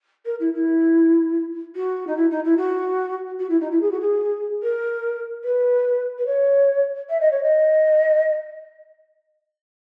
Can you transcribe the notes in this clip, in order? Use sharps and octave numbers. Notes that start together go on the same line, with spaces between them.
A#4
E4
E4
F#4
D#4
E4
D#4
E4
F#4
F#4
E4
D#4
E4
G#4
F#4
G#4
A#4
B4
B4
C#5
E5
D#5
C#5
D#5